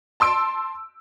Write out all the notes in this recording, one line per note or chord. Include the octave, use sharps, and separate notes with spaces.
A5 C6 E6 D7